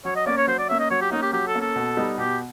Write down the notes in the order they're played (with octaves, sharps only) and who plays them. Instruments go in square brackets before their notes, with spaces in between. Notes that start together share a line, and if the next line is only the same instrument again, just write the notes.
[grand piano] F#3 [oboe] C#5
[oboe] D#5
[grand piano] A#3 C#4 [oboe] D5
[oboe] C#5
[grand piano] F#3 [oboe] C5
[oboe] D5
[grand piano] A#3 C#4 [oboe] E5
[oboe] D#5
[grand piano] F#3 [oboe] C#5
[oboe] G4
[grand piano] A#3 C#4 [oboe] D#4
[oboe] G4
[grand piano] F#3 [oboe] G4
[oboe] A4
[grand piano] A#3 C#4
[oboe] A4
[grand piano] B2
G3 B3 D#4
[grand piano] B2 [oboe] G4